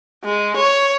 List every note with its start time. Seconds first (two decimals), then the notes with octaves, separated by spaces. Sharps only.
0.24 G#3
0.56 C#5